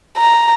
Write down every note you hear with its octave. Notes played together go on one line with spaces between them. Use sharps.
A#5